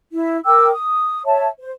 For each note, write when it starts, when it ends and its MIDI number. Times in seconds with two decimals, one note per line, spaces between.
0.13 0.40 64
0.45 0.70 70
0.45 0.70 79
0.45 0.70 86
0.45 0.70 88
0.72 1.23 87
1.25 1.47 73
1.25 1.47 76
1.25 1.47 81
1.59 1.71 72